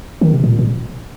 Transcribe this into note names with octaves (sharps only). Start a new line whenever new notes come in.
D#3
C3
A#2
A#2